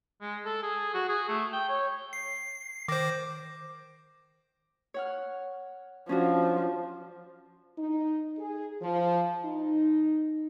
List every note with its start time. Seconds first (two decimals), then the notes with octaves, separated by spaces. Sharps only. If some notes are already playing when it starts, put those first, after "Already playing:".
0.21 G#3
0.45 A4
0.63 G#4
0.94 F#4
1.09 G#4
1.28 A3
1.53 G5
1.69 C#5
2.13 C7
2.88 D#3 C5 D6 A#6
4.94 C#5 F#5 F6
6.09 F3 C#4 D4 F#4
7.78 D#4
8.39 G#4
8.82 F3
9.44 D#4